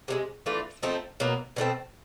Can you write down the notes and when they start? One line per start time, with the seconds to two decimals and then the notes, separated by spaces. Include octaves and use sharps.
0.08 C3 E3 G#3
0.46 E3 A3 D4 F4
0.83 F3 A3 C4 D#4
1.20 B2 F#3 A#3
1.56 B2 F#3 A3 C4